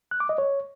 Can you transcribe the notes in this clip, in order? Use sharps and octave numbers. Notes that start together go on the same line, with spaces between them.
F#6
D6
D#5
C#5